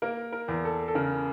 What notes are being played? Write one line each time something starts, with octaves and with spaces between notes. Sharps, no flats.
A#3 A#4
A#4
E2
A4
A4
C#3 A#4